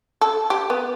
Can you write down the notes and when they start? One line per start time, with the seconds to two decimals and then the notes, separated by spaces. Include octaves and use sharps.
0.21 A4
0.50 G4
0.70 B3